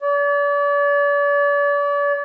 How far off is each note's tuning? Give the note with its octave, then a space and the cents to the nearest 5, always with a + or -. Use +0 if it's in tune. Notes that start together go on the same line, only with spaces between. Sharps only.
D5 -40